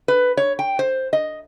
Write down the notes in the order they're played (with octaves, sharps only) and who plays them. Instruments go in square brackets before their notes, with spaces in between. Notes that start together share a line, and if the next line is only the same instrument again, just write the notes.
[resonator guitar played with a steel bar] B4
C#5
G5
C5
D#5